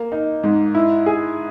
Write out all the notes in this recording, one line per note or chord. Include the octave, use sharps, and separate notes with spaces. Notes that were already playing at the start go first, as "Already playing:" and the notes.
Already playing: A#3
D#4
G#2
E4
G#4